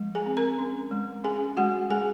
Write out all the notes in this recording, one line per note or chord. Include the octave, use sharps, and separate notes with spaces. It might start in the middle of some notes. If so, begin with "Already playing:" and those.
Already playing: F3 G#3
G#4 G#5
C4
A#4 A#5
C#4
G#3
C#4 G#4 G#5
G#3 F#4 F#5
G#3 G#4 G#5